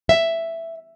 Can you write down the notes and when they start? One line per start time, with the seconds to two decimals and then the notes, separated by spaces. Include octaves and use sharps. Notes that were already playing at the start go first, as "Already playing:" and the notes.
0.09 E5